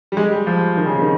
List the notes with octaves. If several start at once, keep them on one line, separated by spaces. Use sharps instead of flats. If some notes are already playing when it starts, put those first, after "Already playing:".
G3
G#3
G3
F3
D#3
C#3
C3
D#3